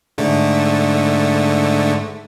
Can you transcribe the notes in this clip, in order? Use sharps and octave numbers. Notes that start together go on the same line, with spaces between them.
G#2 D3 A3